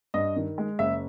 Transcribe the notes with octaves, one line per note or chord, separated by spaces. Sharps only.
G2 D#5
D#3
G#3
F#1 E5